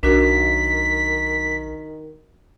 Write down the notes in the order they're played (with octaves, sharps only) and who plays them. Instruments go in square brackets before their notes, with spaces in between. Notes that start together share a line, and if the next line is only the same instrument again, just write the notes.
[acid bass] B1 [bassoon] D#3 [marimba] D4 F#4 A#4 [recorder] B6